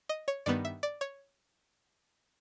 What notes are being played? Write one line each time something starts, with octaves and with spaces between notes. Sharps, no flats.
D#5
C#5
G2 D#3 G3 B3 D5
E5
D5
C#5